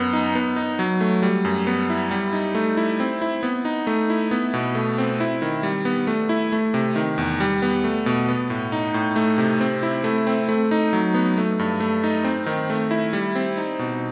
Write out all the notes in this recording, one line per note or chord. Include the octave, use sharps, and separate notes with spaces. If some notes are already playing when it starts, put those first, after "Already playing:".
Already playing: F#2 B3
D#4
B3
D#4
F#3
A3
G3
F#2
B3
E4
G3
D#4
A3
E4
C4
E4
B3
D#4
A3
E4
B3
B2
A3
C4
E4
D#3
G3
B3
A3
E4
A3
C3
D#3
E2
G3
B3
A3
B2
B3
A2
D#4
A2
A3
C3
C4
E4
A3
C4
A3
D#4
F#3
B3
A3
G2
A3
D#4
C4
D#3
A3
E4
G3
C4
D#4
B2